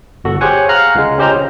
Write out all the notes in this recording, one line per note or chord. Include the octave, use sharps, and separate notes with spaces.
G1 F#4 A4
G4 G#4 C5 C#5 F#5 G#5
F5 F#5 A#5 F6 F#6
C#2 G#3
C#4 G4 C5 D#5 A#5
C#3